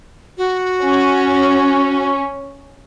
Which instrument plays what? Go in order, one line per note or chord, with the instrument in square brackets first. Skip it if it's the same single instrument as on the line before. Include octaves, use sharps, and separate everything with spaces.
[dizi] F#4
[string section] C#4